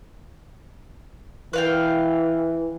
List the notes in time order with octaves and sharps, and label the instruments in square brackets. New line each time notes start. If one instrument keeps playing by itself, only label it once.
[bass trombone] E3 [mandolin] B4 F5 G5